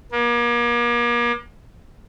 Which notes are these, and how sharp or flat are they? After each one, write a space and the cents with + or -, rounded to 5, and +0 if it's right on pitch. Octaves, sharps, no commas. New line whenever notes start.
A#3 +40